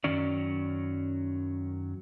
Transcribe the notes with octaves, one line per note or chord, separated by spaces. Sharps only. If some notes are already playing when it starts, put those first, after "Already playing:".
F#2 D#3 F#3 C#4 D5